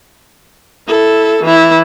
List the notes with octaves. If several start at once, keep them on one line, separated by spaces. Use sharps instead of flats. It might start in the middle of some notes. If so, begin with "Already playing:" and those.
E4 A4
E3 E4